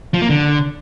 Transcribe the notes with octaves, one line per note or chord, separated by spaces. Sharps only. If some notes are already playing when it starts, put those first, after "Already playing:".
F3
A#3
D3